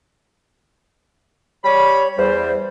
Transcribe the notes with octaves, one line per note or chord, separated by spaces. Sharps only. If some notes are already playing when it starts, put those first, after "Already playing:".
G3 C#5 B5
E2 G3 C5